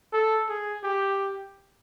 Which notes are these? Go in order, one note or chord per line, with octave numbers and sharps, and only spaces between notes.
A4
G#4
G4